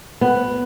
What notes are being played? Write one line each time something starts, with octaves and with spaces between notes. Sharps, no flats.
B3